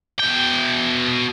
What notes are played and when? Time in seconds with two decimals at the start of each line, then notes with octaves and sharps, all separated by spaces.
0.20 B2 G5